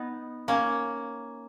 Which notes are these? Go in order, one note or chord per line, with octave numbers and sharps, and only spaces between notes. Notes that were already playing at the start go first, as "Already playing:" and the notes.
Already playing: B3 D#4
A#3 C#4